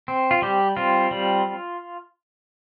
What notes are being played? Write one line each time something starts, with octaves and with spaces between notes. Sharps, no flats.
C4
F4
G3 G4
C4 F4
G3